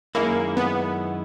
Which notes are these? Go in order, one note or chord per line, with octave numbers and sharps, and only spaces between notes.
F#2 D#3 G#3 A#3 C#4 E4
B3